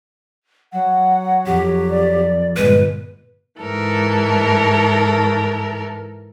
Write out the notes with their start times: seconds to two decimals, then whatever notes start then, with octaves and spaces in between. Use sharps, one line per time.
0.73 F#3 F#5
1.46 F2 G4
1.90 D5
2.56 G1 G2 A#2 G#3 B4
3.61 G#2 E3 A4 A#4